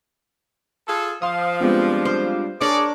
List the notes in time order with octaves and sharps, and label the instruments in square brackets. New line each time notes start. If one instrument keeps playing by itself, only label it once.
[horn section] F4 G#4 A4
[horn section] F3 [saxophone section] F5 [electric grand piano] C6 D#6
[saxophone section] G3 D4 F4 [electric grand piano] G#3 B3 C4
[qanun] C5
[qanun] D4 A#4 C#5 [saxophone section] G#4 [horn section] D5